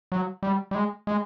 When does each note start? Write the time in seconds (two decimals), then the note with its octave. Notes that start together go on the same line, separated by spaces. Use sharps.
0.12 F#3
0.43 G3
0.71 G3
0.75 G#3
1.07 G#3